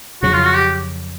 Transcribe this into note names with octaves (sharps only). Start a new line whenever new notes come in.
F2 C#3 F#3 F#4
F4
F#4
G4